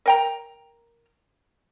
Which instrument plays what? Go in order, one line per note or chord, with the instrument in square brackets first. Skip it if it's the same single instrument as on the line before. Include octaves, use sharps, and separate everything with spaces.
[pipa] A#4 G5 A#5